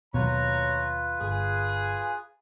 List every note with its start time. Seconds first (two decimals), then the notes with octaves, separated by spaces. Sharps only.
0.14 D#2 B2 F#3 F4 B4 C#5 A#5
1.21 G1 G#4